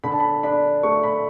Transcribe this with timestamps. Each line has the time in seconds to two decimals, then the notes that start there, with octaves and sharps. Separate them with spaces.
0.04 D3 B5
0.11 A5
0.20 B5
0.43 D4 B5
0.83 A3 C#6
1.03 B5